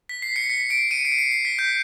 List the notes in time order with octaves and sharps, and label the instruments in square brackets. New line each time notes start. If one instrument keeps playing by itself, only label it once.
[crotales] B6
C7
B6 C#7
B6 C#7
C7 D7
C#7 D#7
C7 D7
C#7
C7
C7
B6
G6